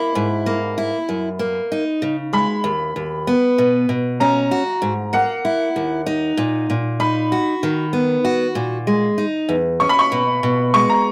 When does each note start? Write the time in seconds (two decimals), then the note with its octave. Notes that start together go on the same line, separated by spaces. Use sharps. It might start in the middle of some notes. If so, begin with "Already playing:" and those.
Already playing: A#3 E4 B5
0.15 G#2
0.46 A#3
0.78 E4
1.09 F#2
1.39 A#3
1.72 D#4
2.02 C#3
2.33 G#3 B5
2.64 D#2
2.96 D#2
3.27 B3
3.58 B2
3.89 B2
4.20 C#4 A#5
4.51 F#4
4.82 G#2
5.13 A#3 F#5
5.45 E4
5.76 D#2
6.06 D#4
6.37 A#2
6.70 A#2
7.00 D#4 B5
7.32 F#4
7.63 D#3
7.93 B3
8.25 F#4
8.55 A#2
8.87 G#3
9.18 D#4
9.49 E2
9.80 C#4 C#6
9.89 B5
9.99 C#6
10.12 B2
10.43 B2
10.74 G#3 C#6
10.90 A#5